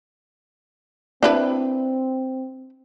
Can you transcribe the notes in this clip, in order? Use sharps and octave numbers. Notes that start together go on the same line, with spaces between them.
C4 D4 E4 B4